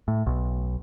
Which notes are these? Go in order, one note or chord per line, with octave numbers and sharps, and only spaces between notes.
A2
B1